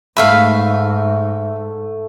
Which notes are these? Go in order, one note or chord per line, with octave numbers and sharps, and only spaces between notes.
G#2 A3 B4 E5 F5